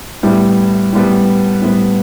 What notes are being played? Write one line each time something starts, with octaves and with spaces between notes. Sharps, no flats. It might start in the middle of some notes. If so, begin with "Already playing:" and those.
A2 G3 B3
A2 G3 B3
A2 G3 B3